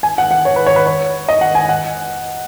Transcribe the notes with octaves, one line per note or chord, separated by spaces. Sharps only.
G#5
F#5
F#5
C#5
B4
C#5
B4
C#5
D#5
F#5
G#5
F#5